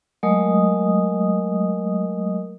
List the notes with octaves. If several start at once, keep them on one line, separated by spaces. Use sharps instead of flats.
F#3 G#3 A3 A#4 D#5 D#6